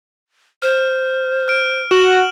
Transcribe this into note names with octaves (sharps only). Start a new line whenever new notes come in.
C5 F6
F6 D7
F#4 E7 F#7